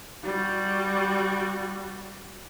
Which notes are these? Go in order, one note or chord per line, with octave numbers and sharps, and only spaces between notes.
G3 F#4